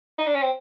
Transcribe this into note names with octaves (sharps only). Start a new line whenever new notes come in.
D#4
D4
C#4
C4